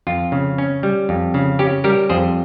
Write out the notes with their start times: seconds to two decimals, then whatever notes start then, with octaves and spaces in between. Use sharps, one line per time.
0.07 F2 F4
0.32 C#3
0.58 C#4
0.83 G3
1.09 F2
1.34 C#3
1.59 C#4 G4
1.84 G3 G4 A#4
2.09 F2 G#4 C5